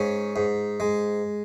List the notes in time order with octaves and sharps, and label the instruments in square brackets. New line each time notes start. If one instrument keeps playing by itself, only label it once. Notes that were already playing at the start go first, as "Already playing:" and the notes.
Already playing: [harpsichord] G#2 C#4
G#2
G#3